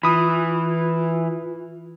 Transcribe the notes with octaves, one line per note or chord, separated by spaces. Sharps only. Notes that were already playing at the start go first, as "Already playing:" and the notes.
E3 F4 B5 D#6